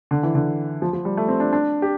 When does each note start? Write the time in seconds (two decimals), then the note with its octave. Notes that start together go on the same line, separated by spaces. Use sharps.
0.11 D3
0.23 E3
0.35 D3
0.82 F3
0.93 F3
1.05 G3
1.17 A3
1.28 C4
1.40 D4
1.53 D4
1.82 G4